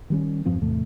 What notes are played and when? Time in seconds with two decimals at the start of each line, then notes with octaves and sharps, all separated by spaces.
0.10 D#3 G3 C#4
0.45 E2 G2 F3 C4
0.61 E2 A2 C3 A3